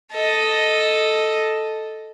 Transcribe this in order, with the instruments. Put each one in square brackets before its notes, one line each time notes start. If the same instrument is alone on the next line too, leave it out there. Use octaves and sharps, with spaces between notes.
[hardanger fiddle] A4 D#5